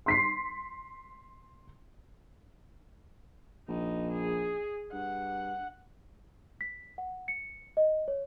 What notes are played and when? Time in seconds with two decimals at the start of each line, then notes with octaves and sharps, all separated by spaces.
0.06 C6 B6 C7
3.68 A#1 D#4
4.12 G#4
4.93 G2 F#5
6.61 B6
6.98 F#5
7.28 C#7
7.77 D#5
8.08 C#5